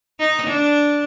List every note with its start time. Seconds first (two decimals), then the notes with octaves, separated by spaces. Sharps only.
0.20 D#4
0.48 D4